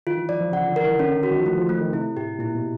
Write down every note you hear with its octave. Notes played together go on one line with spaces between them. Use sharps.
D#3 F4
E3
F3 D5
F3
C#3 F#5
D3
A#4
E3
D3 C#4
D#3
F#4
D#3
F3
E3 A3
F3
A3
D#3
C3 E4
A2 G4
A#2 E4
B2